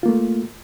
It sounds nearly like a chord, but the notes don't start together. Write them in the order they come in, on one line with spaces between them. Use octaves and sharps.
F4 A#3 A3